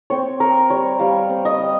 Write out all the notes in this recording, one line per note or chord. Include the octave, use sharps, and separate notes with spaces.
C4 C#5
C4 A#4
G3 C#5
G3 F5
C4
D#5
G3